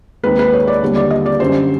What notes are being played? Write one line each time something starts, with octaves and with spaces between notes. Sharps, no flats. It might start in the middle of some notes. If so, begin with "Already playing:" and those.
D#2 D#3 G#3 C4 B4
B4
C#5
D5
D#2 D3 G3 B3
D5
D#5
D5
F#2 D3 G3 C5